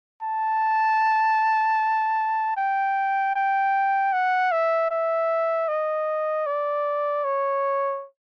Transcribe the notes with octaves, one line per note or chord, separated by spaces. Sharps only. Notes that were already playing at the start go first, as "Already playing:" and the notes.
A5
G5
G5
F#5
E5
E5
D#5
D5
C#5